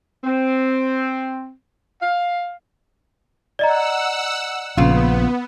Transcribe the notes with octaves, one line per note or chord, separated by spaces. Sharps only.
C4
F5
D5 D#5 F#5 A#5 E6
A#1 C#3 B3 F4